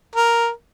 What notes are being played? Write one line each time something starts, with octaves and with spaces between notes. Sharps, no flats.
A#4